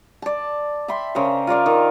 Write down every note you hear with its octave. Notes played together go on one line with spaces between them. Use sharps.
D5 A5
E5 G5 B5 C6
C#3 A#4 C5
F4 A#4 D5 F5
D#3